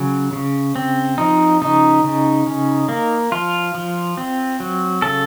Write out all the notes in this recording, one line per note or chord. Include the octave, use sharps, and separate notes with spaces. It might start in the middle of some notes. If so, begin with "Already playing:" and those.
Already playing: C#3 F#3
C#3
C4
F3 D#4
C#3 D#4
C#3
C#4
A#3
F3 F4
F3
C4
F#3
C#3 A4